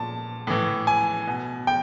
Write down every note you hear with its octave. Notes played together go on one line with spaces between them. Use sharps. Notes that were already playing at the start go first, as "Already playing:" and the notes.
Already playing: A#2 A5
A2 E3
G#5
B2
G5